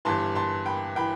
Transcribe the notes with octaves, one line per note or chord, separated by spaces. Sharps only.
G1 G2 E3 A5 C6
A5 C6
G5 B5
E3 G5 B5